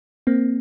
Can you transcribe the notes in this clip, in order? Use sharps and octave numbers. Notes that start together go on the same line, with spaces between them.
A#3 C4